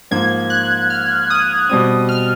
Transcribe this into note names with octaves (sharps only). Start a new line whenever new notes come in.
G#2 F3 A#3 G#6
F#6
F6
D#6
B2 G3 C4 D#6
F6